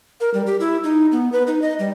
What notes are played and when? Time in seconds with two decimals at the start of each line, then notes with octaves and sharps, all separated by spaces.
0.20 A#4
0.34 G3
0.46 G4
0.60 E4
0.84 D#4
1.12 B3
1.32 B4
1.47 D#4
1.62 D#5
1.79 G3